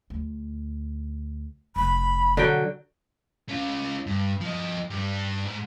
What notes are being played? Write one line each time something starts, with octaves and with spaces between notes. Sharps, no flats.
D2
F1 B5
B1 D3 F#3 G5
C#4 F4
G2
F3 D#5
G2 G3
G#2